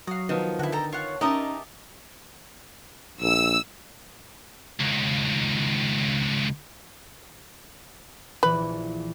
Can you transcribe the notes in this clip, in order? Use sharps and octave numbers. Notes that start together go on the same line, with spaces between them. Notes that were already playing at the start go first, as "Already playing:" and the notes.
F#3 F5 D#6
D#3 F3 B3
D3 E4 F#4
A4 G5 A5 A#5
F4 C#5 F#5
C#4 D#4 G4 A#4 D#5 E5 A5
A#1 E6
C#2 D#3
A#1 E3 B4